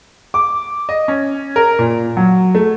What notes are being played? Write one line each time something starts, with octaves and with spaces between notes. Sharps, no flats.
D6
D#5
C#4
A#4
A#2
F#3
A3